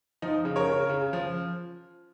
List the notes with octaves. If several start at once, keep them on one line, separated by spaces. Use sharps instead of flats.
F3 D#4
C#3
A#4 C#5
C#3
C#3
F3